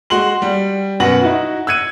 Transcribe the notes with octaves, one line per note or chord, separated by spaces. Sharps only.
G#3 F#4 C6 F#7
G3
F#2 B2 B4 F#5 A#6 F#7
D#4 E4 F#4
E6 F#6 G#6 C#7 D#7